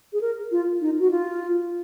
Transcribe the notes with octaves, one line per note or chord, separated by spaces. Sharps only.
G#4
A#4
F4
D#4
F#4
F4